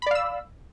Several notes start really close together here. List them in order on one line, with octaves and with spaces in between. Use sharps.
B5 D5 F5 E6